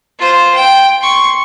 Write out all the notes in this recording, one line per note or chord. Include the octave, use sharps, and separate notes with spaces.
F4 C5
G5
C6 C#6